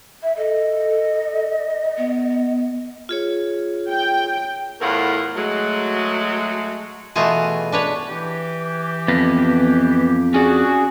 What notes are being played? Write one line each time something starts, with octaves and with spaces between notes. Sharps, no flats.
E5
A4 D#5
B3
F4 G#4 C#5
G5
E2 A2 A3 F4 A#4 F#5
F#3 G#3 A3
B2 E3 A3 F4 F#4 G#4
D4 B4 C#5
E3 G4
F2 B3
C#4 F#4 G#4 D5